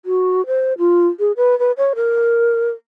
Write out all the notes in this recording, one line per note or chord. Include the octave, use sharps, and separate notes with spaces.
F#4
C5
F4
G#4
B4
B4
C#5
A#4